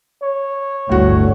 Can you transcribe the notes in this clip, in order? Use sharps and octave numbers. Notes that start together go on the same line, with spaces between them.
C#5
G1 D2 A2 F#4